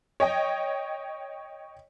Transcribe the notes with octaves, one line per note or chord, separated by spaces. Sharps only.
C#5 D#5 G5